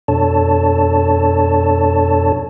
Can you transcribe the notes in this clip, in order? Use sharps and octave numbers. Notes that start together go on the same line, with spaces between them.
F2 B2 D4 A4 C#5 A5